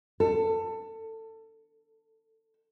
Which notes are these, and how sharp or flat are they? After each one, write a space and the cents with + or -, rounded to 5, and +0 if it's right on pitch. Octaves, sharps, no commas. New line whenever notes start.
A4 +20